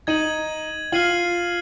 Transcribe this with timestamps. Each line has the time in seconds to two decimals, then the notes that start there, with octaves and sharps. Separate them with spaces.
0.07 D#4 G#6 D#7 F#7
0.92 F4 F6 C7 D#7 F#7